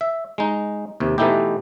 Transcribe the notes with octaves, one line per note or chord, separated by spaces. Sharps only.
E5
G#3 D#4
D#2 C3
B2 E3 A3 D#4 E4 G4